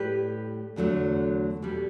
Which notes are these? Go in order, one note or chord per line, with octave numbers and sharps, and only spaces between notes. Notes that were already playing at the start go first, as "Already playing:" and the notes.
Already playing: A2 G3 G4 B4
E2 D3 F#3 A3
B2 G3